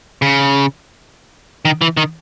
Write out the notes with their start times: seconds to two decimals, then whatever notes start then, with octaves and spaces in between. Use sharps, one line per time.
0.22 C#3
1.65 D#3
1.82 E3
1.97 D#3